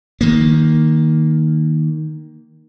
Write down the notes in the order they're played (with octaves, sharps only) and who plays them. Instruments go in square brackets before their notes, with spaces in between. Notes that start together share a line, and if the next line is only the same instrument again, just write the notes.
[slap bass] D#3 A#3